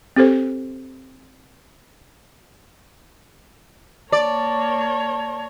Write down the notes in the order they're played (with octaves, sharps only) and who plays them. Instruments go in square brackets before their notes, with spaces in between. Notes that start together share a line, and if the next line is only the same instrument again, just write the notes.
[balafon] C4 G4 A4 C5
[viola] A#3 C#5 [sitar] D5 [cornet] A5